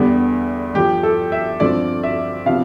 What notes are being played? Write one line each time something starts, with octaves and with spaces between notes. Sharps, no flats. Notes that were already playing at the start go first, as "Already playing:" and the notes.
Already playing: E2 D3 G3 B3 D4
G2 D3 F3 G4
A4
E5
G2 D3 F3 C4 D5
E5
C3 F3 B3 D4 F5